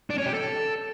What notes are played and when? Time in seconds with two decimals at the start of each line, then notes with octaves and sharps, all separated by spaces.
0.10 D4
0.18 C#4
0.26 G4
0.34 A4